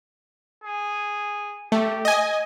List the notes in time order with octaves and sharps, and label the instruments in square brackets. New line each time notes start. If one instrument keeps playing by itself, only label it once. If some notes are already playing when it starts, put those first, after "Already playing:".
[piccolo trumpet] G#4
[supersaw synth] A3 [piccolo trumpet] G4
[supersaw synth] D#5 G#5